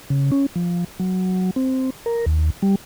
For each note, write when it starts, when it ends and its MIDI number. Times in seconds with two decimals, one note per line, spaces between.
0.10 0.31 49
0.32 0.46 61
0.55 0.84 53
0.99 1.51 54
1.56 1.90 60
2.06 2.25 70
2.26 2.50 39
2.62 2.75 55